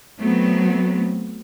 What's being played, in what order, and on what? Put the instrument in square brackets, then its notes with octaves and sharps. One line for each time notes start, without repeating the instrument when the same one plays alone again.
[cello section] F#3 A3 B3 C4